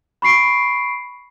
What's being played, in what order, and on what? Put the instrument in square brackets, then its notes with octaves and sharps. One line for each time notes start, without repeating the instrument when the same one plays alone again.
[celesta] B5 C#6 C7 D7